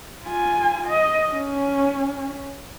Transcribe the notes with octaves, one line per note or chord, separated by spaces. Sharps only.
F4 G#5
D#5
C#4